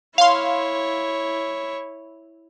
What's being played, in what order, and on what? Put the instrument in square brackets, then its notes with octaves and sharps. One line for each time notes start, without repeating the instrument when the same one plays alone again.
[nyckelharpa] E4 C#5 [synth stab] F5 C6